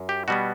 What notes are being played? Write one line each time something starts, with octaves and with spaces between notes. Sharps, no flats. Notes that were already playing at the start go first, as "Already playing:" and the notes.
Already playing: F#2
G4
B2 G3 B3 F#4